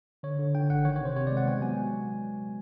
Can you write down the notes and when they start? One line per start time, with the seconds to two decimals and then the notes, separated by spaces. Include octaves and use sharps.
0.23 D3 C#5
0.39 D3
0.55 D3 G5
0.70 G1 F#5
0.85 D#3 C#5
0.96 C#5
1.01 C3 C5
1.16 C3 C#5
1.27 D5
1.31 G#3
1.37 F#5
1.46 B3 G5
1.62 F#3 G#5